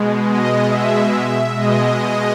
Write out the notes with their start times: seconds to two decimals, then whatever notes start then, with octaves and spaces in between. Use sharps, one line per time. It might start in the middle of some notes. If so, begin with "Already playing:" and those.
Already playing: B2 G#3
0.26 D#5
0.68 E5
1.12 E5
1.54 B2 G#3 D#5